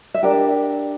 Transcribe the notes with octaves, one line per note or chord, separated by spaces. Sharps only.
E5
D4 G4 A#4 D5